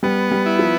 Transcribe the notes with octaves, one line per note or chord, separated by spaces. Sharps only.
G3 B3
G3
E4
F3